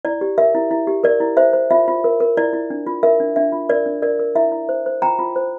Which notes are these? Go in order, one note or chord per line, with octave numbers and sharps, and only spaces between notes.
E4 D5
G4
A#4 E5
E4
E4
G4
A#4 D5
E4
C5 E5
C5
F4 E5
F4
A#4
A#4
E4 D5
E4
D4
F4
A#4 E5
D4
D4 E5
F4
A#4 D5
D4
A#4 D5
A#4
E4 E5
E4
C5
C5
F4 G5 A#5
F4
C5